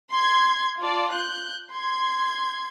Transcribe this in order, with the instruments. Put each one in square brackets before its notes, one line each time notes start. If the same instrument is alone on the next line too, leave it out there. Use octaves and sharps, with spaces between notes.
[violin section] C6 G#6
F4 D5 A5
F#6 G6
C6 G#6